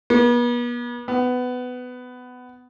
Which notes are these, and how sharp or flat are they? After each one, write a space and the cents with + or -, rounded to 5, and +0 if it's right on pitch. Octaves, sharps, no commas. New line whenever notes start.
B3 -40
B3 +15